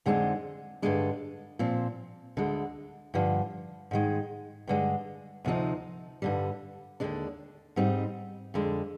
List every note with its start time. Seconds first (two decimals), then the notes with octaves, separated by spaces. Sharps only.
0.06 F2 D3 G#3 C4 D#4
0.82 G2 D3 G#3 D4
1.59 A#2 F3 C4
2.37 D2 D3 G#3
3.14 G2 D3 F3
3.91 G#2 D#3 G#3
4.67 G2 D3 G#3
5.45 D2 C3 F3 C4 D#4
6.22 G2 D3 G3
7.00 D#2 D3 G#3 D4
7.76 G#2 G3 C4 D#4
8.54 F2 D3 G#3